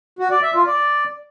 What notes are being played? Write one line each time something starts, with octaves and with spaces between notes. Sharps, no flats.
F#4
D5
E5
F4
D5